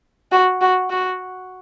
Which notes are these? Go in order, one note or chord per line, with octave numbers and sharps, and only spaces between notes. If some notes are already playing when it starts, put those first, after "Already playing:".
F#4
F#4
F#4